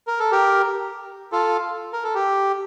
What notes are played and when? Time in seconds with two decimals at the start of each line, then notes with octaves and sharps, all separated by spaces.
0.07 A#4
0.20 A4
0.32 G4 A#4
1.32 F4 A4
1.93 A#4
2.04 A4
2.15 G4